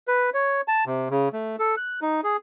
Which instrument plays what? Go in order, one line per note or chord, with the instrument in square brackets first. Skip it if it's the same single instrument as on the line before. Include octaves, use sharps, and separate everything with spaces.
[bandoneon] B4
C#5
A5
C3
C#3
A3
A4
F#6
D#4
G#4